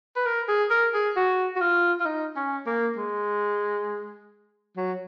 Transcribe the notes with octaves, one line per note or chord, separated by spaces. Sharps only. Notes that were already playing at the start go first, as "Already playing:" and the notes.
B4
A#4
G#4
A#4
G#4
F#4
F#4
F4
F4
D#4
C#4
A#3
G#3
F#3